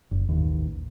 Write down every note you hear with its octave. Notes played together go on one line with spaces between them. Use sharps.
F#1
A1 D#2